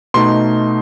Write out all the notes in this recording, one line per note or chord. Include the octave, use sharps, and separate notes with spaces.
B2 A3 D#4 C6